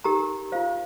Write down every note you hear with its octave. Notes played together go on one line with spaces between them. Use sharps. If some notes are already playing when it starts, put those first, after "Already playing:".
D#4 G4 A#4 A#5
F4 C5 F5